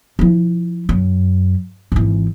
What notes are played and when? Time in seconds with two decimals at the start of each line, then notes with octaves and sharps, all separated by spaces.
0.19 F3 E4
0.89 F#2
1.92 G#1 E3